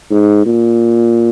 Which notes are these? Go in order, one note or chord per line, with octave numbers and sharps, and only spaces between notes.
G#2
A#2